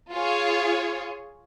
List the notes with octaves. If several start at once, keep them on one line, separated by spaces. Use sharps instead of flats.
F4 G#4 C#5